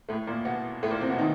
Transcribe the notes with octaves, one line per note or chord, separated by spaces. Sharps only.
A2 A3
A#2 A#3
B2 B3
A2 A3
A#2 A#3
C3 C4
B2 B3
D#3 D#4